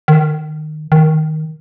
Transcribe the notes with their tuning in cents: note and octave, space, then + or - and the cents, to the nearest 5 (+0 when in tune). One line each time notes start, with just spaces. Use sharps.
D#3 -20
D#3 +5